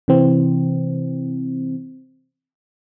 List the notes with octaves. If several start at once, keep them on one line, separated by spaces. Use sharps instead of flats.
C3 E3 C4